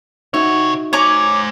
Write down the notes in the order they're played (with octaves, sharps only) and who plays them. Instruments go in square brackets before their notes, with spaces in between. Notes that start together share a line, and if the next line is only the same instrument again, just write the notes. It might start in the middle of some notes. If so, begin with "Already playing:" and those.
[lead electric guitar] C3 C#5 [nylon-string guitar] D#4 F#4 E5
[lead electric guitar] C5 G#5 [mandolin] C#5 A#5 D6